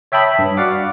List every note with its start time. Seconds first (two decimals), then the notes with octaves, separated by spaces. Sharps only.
0.12 C#5 E5 G5 A5 B5 D#6
0.39 G2
0.57 F#4 D5 F5 F#5 D6